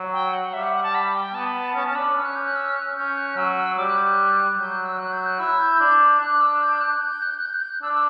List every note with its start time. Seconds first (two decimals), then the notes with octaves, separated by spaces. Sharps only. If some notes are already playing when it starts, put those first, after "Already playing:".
Already playing: F#3
0.13 G5
0.33 F#5
0.53 G3 E5
0.63 F#5
0.74 F#5
0.83 A5
0.95 B5
1.15 G5
1.34 B3 A5
1.47 B5
1.58 A5
1.75 C#4 A5
1.85 C#4 A5
1.95 D4 B5
2.15 C#4 E6
2.25 F#6
2.36 G6
2.46 F#6
2.56 E6
2.76 F#6
2.96 C#4 G6
3.17 F#6
3.36 F#3 E6
3.77 G3 D6
3.87 F#6
3.97 G6
4.08 F#6
4.58 F#3 G6
4.72 F#6
4.85 E6
4.98 F#3 F#6
5.12 G6
5.26 F#6
5.39 E4 E6
5.59 G6
5.80 D4
6.20 D4 F#6
6.41 E6
6.61 G6
6.81 F#6
7.01 G6
7.22 F#6
7.30 G6
7.38 F#6
7.45 G6
7.54 F#6
7.62 G6
7.70 F#6
7.82 D4 E6
7.93 E6